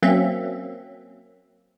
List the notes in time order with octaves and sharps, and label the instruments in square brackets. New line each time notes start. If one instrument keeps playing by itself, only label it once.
[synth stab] F#3 A#3 C4 C#4 E5